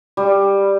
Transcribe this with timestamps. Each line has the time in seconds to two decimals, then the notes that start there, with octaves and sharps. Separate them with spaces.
0.17 G3